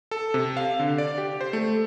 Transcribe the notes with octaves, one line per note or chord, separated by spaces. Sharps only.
A4
C3
F5
D3
D5
G4
C5
A3